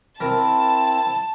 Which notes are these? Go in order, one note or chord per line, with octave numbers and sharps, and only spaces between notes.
C4 E4 A#4 A5